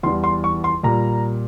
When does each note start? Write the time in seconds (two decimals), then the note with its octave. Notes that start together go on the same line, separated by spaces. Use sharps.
0.03 E2 C6
0.06 E3 G3
0.24 C6
0.44 C#6
0.64 C6
0.83 A#2 G3 A#5